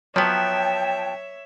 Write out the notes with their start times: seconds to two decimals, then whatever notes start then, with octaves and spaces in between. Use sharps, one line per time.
0.16 F3 F#3 B3 C#5 E5 G5 A5